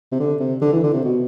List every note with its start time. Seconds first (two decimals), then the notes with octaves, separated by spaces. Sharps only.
0.12 C3
0.20 D3
0.40 C3
0.61 D3
0.73 E3
0.83 D3
0.93 C3
1.04 B2